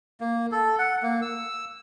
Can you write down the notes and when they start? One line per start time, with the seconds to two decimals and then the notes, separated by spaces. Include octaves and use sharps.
0.21 A#3
0.52 A4
0.79 F#5
1.03 A#3
1.22 E6